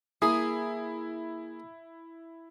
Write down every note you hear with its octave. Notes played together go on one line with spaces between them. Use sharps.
A#3 E4 G#4 G#5 A#5 D#6